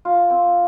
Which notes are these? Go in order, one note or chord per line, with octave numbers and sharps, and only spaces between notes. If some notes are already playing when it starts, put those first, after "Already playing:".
F4
C4